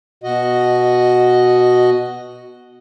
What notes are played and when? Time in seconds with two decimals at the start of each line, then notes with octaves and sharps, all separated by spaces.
0.24 B2 F#4 D#5